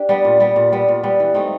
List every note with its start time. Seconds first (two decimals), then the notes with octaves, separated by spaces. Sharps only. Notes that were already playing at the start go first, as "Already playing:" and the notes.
Already playing: D4 G4
0.09 G3 B3
0.25 A#2
0.40 G3 B3
0.56 A#2
0.72 G3 B3
0.89 A#2
1.03 G3 B3
1.20 E3
1.34 A3 C4 D#4